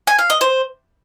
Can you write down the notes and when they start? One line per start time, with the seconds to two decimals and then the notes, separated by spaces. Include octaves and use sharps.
0.07 G#5
0.19 F5
0.30 D#5
0.41 C5